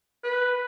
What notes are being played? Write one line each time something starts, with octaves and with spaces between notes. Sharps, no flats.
B4